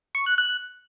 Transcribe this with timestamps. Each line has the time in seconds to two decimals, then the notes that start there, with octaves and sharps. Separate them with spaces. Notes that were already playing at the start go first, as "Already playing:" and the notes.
0.15 C#6
0.26 F#6
0.38 F#6